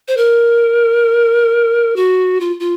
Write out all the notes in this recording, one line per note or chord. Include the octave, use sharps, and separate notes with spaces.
C5
A#4
F#4
F4
F4